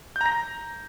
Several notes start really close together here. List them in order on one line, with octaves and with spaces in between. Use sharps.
G6 A#5 A#6